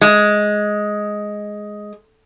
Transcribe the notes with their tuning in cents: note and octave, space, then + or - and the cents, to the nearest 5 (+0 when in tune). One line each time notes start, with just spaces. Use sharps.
G#3 +5